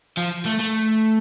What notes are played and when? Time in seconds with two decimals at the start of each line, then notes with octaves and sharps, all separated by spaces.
0.17 F3
0.45 A3
0.59 A3